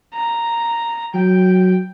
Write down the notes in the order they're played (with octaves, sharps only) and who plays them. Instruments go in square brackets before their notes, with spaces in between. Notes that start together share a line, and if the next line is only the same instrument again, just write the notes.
[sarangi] A#5
[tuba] F#3 [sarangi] G5